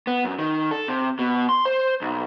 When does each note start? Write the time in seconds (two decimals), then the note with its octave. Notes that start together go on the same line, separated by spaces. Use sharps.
0.07 B3
0.25 F#2
0.39 D#3
0.71 A4
0.88 C3
1.19 B2
1.49 C6
1.65 C5
2.02 B1